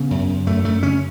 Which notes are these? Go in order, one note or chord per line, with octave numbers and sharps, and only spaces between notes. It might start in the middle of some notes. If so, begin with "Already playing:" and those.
Already playing: C#3 B3
F#2
F#2
F#2 A3
F#2 A3
C#3 C#4